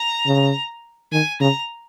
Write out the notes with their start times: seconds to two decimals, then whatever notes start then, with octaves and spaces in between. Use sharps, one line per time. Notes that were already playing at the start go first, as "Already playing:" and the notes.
Already playing: A#5
0.26 C#3
1.12 D#3 G#5
1.40 C#3 A#5